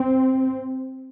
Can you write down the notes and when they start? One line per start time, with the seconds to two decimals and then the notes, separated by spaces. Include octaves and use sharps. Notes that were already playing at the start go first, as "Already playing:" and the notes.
Already playing: C4